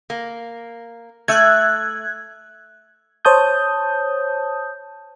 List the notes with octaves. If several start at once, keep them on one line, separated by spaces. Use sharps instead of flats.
A#3
A3 E5 F#6 G#6
C5 C#5 A5 D#6 G6